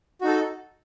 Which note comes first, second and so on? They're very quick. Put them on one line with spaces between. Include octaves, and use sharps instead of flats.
F#4 D#4 A4